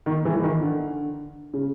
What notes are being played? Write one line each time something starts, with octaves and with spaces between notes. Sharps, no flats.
D#3
E3
E3
D#3
D3
C#3